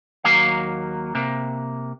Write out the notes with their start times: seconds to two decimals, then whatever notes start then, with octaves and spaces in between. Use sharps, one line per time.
0.24 D#2 F#3 A#3 F5
1.15 C3 A#3